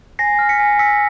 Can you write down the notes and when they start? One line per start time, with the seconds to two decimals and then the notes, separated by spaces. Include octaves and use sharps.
0.19 G#5 A#6 C7
0.39 F6
0.49 B6 C#7
0.59 G#5
0.79 E6 B6 C#7